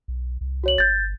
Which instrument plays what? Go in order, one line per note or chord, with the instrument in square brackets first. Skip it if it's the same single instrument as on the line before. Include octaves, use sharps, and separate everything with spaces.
[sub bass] B1
C2
[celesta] F#4 C#5 F#7
[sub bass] G1 [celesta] G6 A6